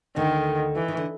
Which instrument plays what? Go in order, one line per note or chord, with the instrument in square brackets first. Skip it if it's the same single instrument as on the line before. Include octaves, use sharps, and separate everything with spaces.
[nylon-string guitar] D2 D3 [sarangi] D#3
[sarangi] E3
[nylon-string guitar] D#3
D3